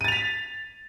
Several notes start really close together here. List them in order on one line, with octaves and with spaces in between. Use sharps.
D#7 A6 F7 B6